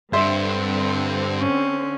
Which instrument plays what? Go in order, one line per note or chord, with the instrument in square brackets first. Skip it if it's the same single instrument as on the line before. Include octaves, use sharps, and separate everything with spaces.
[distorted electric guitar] G2 [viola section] D3 C4 [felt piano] C5 E5
[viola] C#4